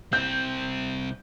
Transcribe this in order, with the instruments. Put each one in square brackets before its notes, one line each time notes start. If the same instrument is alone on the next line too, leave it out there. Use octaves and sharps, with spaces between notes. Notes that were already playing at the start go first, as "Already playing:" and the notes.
[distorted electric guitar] C2 C4 [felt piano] G6